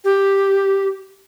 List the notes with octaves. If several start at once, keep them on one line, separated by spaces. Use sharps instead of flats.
G4